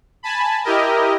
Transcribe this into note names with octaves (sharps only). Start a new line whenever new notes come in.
G#5 A5 B5
E4 G4 A#4 D#5